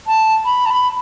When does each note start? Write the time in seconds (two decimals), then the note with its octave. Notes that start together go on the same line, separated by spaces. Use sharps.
0.07 A5
0.45 B5
0.65 A5
0.70 B5